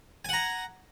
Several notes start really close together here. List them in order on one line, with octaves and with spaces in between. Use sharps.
G#5 F#5 A#5